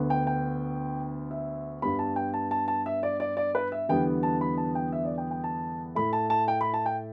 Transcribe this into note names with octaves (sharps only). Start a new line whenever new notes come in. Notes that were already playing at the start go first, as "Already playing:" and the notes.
Already playing: D2 D3 B3
G5
G5
E5
G2 G3 B3 B5
A5
G5
A5
A5
A5
E5
D5
D5
D5
B4
E5
E2 D3 G3 B3 G5
A5
B5
A5
G5
E5
D5
G5
G5
A5
A2 A3 B5
A5
A5
G5
B5
A5
G5